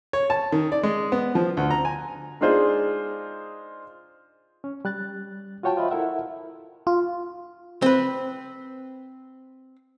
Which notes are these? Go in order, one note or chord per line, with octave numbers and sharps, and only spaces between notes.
C#5
A5
D#3
D5
G#3
B3
F3
D2
A#5
G#5
G#3 D4 D#4 F4 G#4 C5
C#4
G3 F#6 A6
F4 F#4 C#5 G5 A5
F4 C5 D#5 E5 B5
E4 A4 A#4 E5 F#5
F4
C4 B4